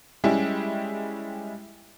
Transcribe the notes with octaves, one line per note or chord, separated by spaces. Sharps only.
G3 G#3 C#4 E4 G4